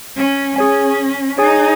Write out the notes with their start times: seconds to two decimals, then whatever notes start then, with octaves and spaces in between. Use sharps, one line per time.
0.15 C#4
0.56 C#4 G#4 C#5 G#5
1.38 D#4 G#4 C#5 G#5